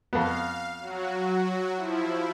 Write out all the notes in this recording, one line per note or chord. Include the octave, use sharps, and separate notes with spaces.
F2 B3 F5
F#3 F#4
F3 E4